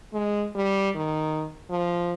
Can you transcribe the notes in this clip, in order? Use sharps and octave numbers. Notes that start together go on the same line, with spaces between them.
G#3
G3
D#3
F3